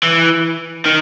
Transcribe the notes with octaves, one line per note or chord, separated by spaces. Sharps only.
E3
D#3